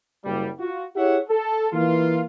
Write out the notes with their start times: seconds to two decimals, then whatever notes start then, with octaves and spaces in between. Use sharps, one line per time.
0.24 F#1 G3
0.60 F4 F#4
0.96 E4 G4 G#4 C#5 E5 F#5
1.29 A4
1.73 E3 A#3 F4